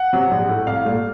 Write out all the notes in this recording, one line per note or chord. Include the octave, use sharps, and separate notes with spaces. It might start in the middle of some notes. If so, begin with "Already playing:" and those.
Already playing: F#5
C3 F#3
A#1
A2 A3
C2 F5
A#2 A3